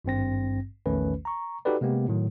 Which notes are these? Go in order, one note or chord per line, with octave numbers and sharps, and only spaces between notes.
G#1 G2 C4 A#6
A#1 E2 D#3 A3 C#4 B4
A#5 C#6
D#4 F#4 G4 A4 B4 D5
C3 G#3 A#3 B3 G4
A2 D#3 F#3